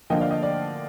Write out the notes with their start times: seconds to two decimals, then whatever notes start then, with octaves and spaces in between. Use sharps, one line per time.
0.10 D3 F3 A#3 D#5 G5
0.20 D5 F5
0.31 D#5
0.43 D5